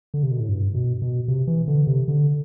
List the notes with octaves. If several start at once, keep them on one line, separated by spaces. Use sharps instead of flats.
D3
C3
B2
A2
G2
B2
B2
C3
E3
D3
C3
D3